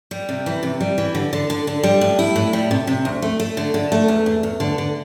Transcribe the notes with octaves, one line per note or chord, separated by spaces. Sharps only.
G3
C3
E3
C3
G3
E3
D3
D3
D3
D3
G3
A2
E4
A2
G3
C3
C3
D2
A3
A3
D3
D3
A3
E2
E2
E2
D3
D3